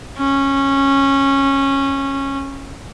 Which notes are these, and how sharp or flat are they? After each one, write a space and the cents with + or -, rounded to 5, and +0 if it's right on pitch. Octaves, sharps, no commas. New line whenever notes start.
C#4 -15